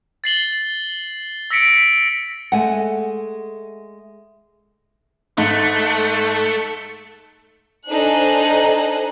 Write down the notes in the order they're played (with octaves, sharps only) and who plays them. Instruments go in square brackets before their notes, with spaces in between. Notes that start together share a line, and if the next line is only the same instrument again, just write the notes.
[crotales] A6 C7 F#7 G7
E6 A#6 B6 C#7 D7
[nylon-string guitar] G#3 A3 [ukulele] F#5 G#5
[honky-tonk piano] G#2 [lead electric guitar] A3
[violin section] D4 D#4 A4 C5 G#5 F#6